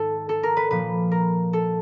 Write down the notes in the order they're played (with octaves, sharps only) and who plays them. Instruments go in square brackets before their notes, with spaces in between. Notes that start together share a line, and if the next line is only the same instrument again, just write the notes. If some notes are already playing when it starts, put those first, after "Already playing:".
Already playing: [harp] G#2 D#3 A4
A4
A#4
B4
A#2 F3 B4
A#4
A4